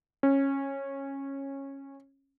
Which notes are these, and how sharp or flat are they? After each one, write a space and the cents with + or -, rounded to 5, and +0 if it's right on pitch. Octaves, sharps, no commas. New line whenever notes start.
C#4 -15